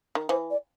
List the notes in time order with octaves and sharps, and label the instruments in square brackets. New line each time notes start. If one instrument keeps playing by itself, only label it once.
[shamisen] D#3
[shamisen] E3 [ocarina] C5
[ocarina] D5